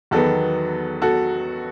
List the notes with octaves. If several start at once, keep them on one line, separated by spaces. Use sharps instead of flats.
E2 D#3 F#3 B3 F#4 A4
F#4 A4